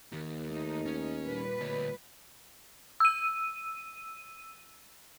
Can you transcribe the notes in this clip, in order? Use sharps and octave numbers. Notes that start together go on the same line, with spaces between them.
D#2 D#3 G4
A3 D#4
C#4
A#2 G3 B4
D2 C#5
E6 D#7